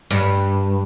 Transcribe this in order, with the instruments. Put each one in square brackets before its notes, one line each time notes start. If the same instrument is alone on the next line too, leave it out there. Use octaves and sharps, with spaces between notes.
[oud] G2